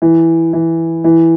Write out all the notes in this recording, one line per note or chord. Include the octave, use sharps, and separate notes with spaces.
E3
E3
E3